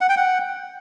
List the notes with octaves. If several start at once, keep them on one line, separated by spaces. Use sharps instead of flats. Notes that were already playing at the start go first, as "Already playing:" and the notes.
F#5
G5
F#5